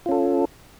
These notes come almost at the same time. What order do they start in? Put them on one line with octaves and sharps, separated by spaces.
F4 C#4 A4